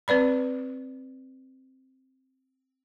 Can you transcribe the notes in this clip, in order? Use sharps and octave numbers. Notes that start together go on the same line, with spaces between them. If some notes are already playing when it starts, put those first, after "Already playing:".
C4 B4 D5 B5